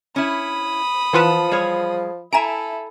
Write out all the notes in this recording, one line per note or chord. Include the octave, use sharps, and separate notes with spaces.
C#4 E4 B5 D#6
E3 F3 F4 B4 F#5 A5
G3 G#4 C#5
E4 A4 E5 G#5 A#5 D7 E7